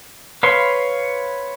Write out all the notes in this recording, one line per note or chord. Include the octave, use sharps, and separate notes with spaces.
B4 C#5 F5 C6